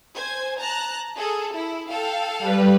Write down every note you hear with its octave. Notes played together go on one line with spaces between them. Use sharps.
C5 G#5 G#6
A5 A#5 F#6
G#4 A4
E4
A4 F5 G5
G3 B4